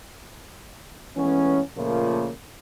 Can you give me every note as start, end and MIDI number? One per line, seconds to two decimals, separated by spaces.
1.16 1.59 52
1.16 1.59 56
1.16 1.59 57
1.16 1.59 59
1.16 1.59 61
1.77 2.28 46
1.77 2.28 49
1.77 2.28 53
1.77 2.28 57
1.77 2.28 58